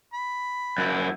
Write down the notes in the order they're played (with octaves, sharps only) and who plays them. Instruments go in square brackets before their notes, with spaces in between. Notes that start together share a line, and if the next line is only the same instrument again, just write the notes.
[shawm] B5
[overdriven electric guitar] F#2 E4